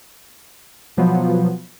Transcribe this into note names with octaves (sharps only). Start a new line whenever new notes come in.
B2 F3 F#3 B3